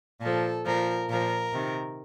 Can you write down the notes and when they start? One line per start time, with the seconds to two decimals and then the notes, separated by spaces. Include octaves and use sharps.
0.21 A#2 F3 A4
0.65 A#2 F3 A#4
1.09 A#2 F3 A#4
1.52 C3 D#3